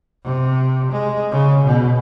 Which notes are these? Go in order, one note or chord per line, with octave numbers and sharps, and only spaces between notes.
C3
G#3
C#3
B2